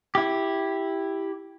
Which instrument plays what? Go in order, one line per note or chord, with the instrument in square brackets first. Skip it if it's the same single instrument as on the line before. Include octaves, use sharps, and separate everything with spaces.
[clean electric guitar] E4 G4